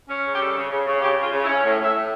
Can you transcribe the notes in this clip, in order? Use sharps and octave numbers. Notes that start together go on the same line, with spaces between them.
C#4
C#3
G4
G3 A4
C#3
C#3
C#3
C#3 G4
C#3 F4
C#3
E4
C#4
A2
A2 E5
A2